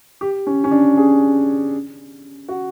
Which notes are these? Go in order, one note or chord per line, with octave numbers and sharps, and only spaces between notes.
G4
C#4
C#4
D4
G#4
F#4